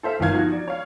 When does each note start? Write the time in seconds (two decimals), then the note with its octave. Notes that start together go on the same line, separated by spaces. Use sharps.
0.03 A4 C5 E5 F5
0.20 G1 D#3 E3 F5 G#6
0.33 F3 D#4 F4 F#4
0.52 D5
0.67 C#5 F5